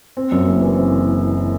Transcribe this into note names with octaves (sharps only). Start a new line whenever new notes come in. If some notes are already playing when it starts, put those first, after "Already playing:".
C4
F#2
F#1
E3
C4